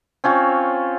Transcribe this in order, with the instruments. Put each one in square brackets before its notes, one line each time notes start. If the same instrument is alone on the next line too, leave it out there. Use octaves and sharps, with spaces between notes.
[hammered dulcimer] C4 C#4 F4 C#5